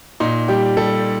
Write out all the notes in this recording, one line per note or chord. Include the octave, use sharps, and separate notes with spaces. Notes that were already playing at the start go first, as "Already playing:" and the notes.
A#2 D#4
G3 G4
G3 A4